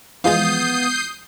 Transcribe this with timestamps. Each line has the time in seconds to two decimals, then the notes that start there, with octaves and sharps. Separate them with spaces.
0.24 E3 F3 G#3 B3 F5 D#6 G6 C7